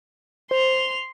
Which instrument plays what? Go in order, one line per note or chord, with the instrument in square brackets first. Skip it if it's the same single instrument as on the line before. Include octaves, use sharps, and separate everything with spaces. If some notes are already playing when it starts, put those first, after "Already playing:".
[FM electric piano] C5 [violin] C6 F7